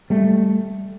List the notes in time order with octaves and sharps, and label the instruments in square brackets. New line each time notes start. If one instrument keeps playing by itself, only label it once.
[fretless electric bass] G3 A3